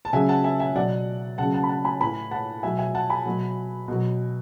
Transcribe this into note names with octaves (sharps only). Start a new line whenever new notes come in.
A5
C#3 F#3 E5 G#5
F#5 A5
E5 G#5
E5 G#5
B2 F#3 D5 F#5
C#3 F#3 F#5 A5
F#5 A5
B5
F#5 A5
G#5 B5
A2 E3 G#5 B5
F#5 A5
B2 F#3 E5 G#5
E5 G#5
F#5 A5
G#5 B5
B2 F#3
B2 F#3